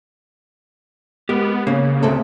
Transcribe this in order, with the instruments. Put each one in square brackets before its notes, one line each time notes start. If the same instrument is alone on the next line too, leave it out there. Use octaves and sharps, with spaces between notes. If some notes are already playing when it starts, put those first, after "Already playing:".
[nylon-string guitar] G#3 [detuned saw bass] B3 [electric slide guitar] G4 A#4
[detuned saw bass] C#3 [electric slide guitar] A#3 [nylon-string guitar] C#4
[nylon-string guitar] D2 C3 A4